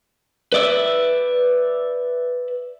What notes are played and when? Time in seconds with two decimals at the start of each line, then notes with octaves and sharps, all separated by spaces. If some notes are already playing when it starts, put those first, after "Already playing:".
0.52 B4 D5 E5